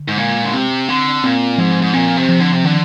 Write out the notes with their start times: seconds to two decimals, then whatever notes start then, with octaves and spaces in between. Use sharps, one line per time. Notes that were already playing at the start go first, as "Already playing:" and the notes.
Already playing: D3
0.08 G#2
0.18 A#2 G#3
0.44 D3
0.53 C3 C4
0.89 D3 C4
1.23 A#2 C4
1.58 G#2 F3
1.82 G#2
1.93 A#2 C4
2.17 C3
2.29 F3
2.40 D3
2.53 C3
2.64 D3 D#3